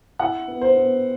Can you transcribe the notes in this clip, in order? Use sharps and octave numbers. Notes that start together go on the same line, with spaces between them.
E4 F#5
B3
C5
B3